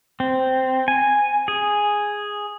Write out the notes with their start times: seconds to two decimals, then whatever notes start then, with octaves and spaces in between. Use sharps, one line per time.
0.20 C4
0.88 G#5
1.48 G#4